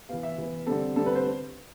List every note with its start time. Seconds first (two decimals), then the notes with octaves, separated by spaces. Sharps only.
0.09 E3 B3 F5
0.23 E5
0.38 E3 B3
0.67 D3 G3 C4 A4
0.96 D3 G3 C4 A4
1.06 B4
1.15 C5